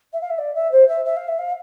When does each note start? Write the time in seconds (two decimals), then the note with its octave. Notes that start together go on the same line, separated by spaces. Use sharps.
0.13 E5
0.21 F5
0.30 E5
0.38 D5
0.55 E5
0.72 C5
0.88 E5
1.05 E5
1.16 F5
1.28 E5
1.38 F5